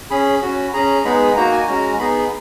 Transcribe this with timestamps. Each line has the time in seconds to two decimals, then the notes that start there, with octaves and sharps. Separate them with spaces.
0.11 C#4 G#4 B5
0.42 C#4 F#4
0.73 C#4 G#4 A#5
1.05 G#3 B3 D#4 G#4 B5
1.36 A#3 D#4 F#4 A#5
1.52 G#5
1.67 G#3 C#4 F#4 A#5
1.99 B3 D#4 G#4 B5